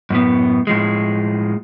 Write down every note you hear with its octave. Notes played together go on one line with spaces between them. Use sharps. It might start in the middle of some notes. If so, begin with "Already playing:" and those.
F#2 A2 B3
A2 F3 G#3